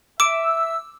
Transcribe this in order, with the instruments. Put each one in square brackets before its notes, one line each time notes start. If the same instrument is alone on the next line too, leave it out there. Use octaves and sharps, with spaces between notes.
[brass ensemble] E5 [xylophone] D6 D7 [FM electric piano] E6